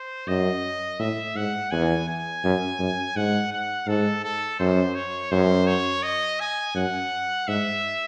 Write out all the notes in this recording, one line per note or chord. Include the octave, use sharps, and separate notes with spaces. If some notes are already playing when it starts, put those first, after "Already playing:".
Already playing: C5
F#2 D#5
A2 E5
G#2 F#5
E2 G#5
G#5
F#2
F#2
G#2 F#5
F#5
G#2 A4
A4
F#2 C5
C#5
F#2 C5
C#5
D#5
G#5
F#2 F#5
G#2 E5